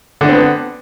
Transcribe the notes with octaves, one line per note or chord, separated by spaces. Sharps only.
D3 B3 C4 D4